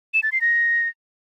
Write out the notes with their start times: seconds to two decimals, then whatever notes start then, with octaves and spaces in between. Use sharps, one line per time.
0.14 E7
0.23 A6
0.32 C7
0.41 A#6